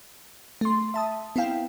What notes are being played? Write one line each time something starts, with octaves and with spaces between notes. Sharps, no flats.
A3 C6
E5 A5 D#6
B3 C4 E4 F5 G5